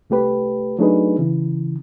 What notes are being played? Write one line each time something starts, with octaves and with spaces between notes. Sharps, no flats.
C2 A3 G4 B4
F#3 A3 D4 D#4 G#4 B4
C#3 E3